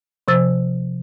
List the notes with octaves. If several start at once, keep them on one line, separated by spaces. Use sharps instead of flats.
C3 F3 C5 E6 A6